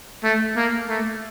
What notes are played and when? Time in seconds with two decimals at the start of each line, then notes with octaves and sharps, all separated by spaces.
0.24 A3
0.56 A#3
0.89 A3